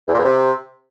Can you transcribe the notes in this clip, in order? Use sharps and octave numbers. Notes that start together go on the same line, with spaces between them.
E2
A#2
E2
C3